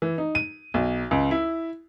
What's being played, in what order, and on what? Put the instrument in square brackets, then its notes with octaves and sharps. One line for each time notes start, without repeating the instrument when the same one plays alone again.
[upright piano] E3
D#4
D#7
B1
C#2
E4